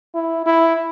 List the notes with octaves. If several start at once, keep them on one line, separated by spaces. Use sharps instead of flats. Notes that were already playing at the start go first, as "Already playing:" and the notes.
E4
E4